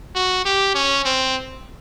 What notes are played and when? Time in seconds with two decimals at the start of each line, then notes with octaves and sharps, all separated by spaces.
0.15 F#4
0.45 G4
0.74 C#4
1.05 C4